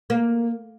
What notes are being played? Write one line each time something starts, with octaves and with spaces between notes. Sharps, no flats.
A#3